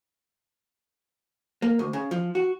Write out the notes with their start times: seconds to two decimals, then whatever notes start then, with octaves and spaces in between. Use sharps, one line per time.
1.62 A#3
1.79 D2
1.93 C#3
2.11 F3
2.35 F#4